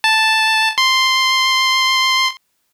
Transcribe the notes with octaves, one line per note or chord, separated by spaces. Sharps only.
A5
C6